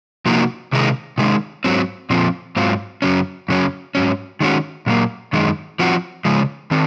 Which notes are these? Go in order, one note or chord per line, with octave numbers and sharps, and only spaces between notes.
C3 F3 A#3 D#4 F#4
C3 D#3 G#3 D#4
C3 D#3 G#3
G#2 F#3 C4
A#2 F3 C4 F4
G#2 F#3 C4 F4
F#2 C#3 F#3 C#4
F#2 C#3 F#3 C#4
G#2 F#3 C#4
D#3 G#3 C#4 F#4
A#2 F#3 A#3
F#2 D#3 G#3 D#4
F3 C4 F#4
C#3 F3 G#3
D#3 C4